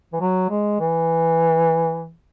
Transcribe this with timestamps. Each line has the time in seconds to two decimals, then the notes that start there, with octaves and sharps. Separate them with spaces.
0.13 E3
0.21 F#3
0.50 G#3
0.80 E3